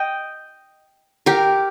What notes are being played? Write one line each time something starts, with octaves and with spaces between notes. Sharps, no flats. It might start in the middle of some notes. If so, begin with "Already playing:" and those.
Already playing: D#5 G5
G4 A#4